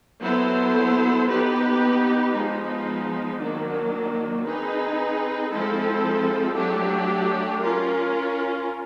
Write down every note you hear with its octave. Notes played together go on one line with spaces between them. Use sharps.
F#3 B3 E4 A4 C5
B3 D#4 G4 B4
F3 G#3 B3 D#4
D#3 F#3 A#3 D4
C4 D#4 G#4 B4
F3 G#3 C4 E4 A4
F#3 A3 D4 G4
C#4 F4 A#4